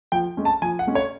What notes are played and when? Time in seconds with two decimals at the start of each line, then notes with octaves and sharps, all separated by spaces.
0.12 F3 G5
0.37 G#3 C#4
0.45 A5
0.62 F3 G#5
0.79 F#5
0.87 G#3 C#4
0.95 C#5